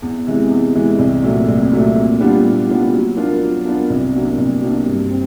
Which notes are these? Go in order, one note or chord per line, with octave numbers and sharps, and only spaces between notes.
E2
C3 E3 G#3
E2
C3 E3 G#3
C2
A#2 F#3 A3
C2
A#2 F#3 A3
A#2
G3 B3 D4 F4
A#2
G3 B3 D4 F4
F#3
B3 D4 F4 A#4
F#3
B3 D4 F4 A#4
C2
B2 F#3 A#3 D4
C2
B2 F#3 A#3 D4
G2
C4